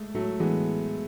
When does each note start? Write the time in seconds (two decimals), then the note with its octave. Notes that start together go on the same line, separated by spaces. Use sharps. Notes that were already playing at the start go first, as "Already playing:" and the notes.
Already playing: G#3 A3
0.15 A2 F#3 A3
0.40 E3 G#3 B3